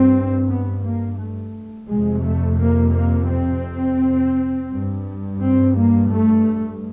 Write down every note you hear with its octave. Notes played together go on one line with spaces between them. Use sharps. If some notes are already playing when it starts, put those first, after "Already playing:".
Already playing: G2 C4
B3
A#3
A3
F2 C3 G#3
A3
A#3
A#3
C4
G2
C4
A#3
A3